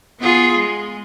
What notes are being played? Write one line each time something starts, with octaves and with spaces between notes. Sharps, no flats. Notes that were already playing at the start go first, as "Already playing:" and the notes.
B3 F4 G#4
G#3